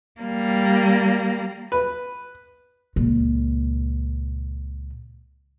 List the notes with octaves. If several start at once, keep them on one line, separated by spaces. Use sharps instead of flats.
G3 A#3
B4
C#2 A#2